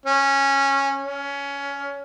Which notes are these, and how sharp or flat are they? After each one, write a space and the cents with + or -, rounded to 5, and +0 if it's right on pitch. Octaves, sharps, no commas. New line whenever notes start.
C#4 -10
C#4 +15